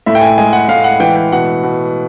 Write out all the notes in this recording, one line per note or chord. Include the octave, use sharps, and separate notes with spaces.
A2 E5
G5
G#5
G#3 G#5
F#5
A2 F5
F#5
E3 G5
G5
B2 F#5
B2